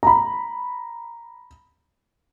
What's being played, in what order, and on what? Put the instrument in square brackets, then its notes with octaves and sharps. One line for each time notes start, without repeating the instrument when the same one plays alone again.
[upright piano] A#5 B5